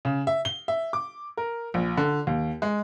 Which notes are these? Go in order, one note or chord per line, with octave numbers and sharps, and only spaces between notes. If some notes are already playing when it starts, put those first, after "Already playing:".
C#3
E5
G7
E5
D6
A#4
A#1
D3
D#2
G#3